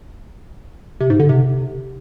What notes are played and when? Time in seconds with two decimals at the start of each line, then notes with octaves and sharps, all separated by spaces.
1.00 C3
1.10 G#2
1.20 D3
1.29 C3